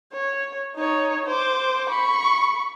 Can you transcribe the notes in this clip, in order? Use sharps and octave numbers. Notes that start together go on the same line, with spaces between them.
C#5
D#4 C#5
C5 D6
B5 C#6